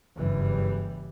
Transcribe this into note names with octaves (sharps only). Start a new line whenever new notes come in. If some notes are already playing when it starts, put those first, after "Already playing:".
F#1 G2 E3 G3